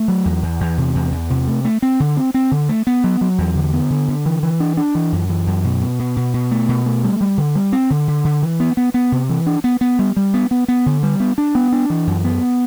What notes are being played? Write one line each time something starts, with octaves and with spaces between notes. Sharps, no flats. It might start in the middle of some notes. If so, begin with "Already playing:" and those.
Already playing: A3
F#3
E2
E2
E2
C3
E2
E2
C3
A3
A3
C4
D3
C4
C4
D3
A3
B3
F#3
F#3
E2
D3
B3
D3
D3
E3
E3
D4
D4
E3
F#2
E3
F#2
B2
B2
B2
B2
B2
A3
B2
A3
G3
G3
D3
G3
C4
D3
D3
D3
E3
B3
B3
B3
C3
E3
D4
B3
B3
G3
G3
B3
B3
B3
D3
G3
B3
D4
B3
D4
E3
F#2
B3